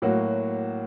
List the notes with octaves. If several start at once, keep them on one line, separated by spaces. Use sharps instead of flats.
A2 F#3 A#3 F#4